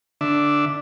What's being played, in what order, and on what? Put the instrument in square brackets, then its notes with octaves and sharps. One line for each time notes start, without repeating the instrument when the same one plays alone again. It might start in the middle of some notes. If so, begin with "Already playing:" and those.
[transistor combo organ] D3 D4 E5